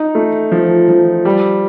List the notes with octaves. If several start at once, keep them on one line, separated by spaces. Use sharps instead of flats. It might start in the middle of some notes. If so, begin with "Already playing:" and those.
Already playing: D#4
A3
F3
F3
G3